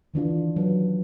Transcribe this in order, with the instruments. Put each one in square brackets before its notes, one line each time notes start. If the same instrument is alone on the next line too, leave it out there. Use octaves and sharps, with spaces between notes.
[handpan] D#3 E3 D4 F4
F#3 B4